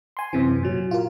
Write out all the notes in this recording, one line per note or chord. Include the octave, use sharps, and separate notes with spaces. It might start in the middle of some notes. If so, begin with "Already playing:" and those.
G#5 C6
F#2 C3 E3
A#2 F#3
F4 A#4